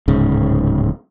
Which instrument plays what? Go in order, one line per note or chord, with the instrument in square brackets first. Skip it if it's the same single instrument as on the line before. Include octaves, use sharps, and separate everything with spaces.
[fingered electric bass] D1 G#2 C#3